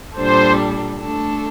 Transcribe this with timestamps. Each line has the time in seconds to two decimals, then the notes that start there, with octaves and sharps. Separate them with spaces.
0.15 A#2 G3 D4 A4 C5
0.99 A3 D4 A4